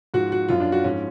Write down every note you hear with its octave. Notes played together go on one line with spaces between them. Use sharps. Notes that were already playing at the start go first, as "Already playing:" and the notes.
G#2 F3 F#4
F#4
F#2 F3 F4
D4
F#4
G#2 F3 C#4